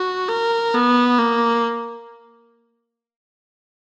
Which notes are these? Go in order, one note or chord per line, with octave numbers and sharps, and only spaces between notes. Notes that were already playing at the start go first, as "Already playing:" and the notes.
Already playing: F#4
A#4
B3
A#3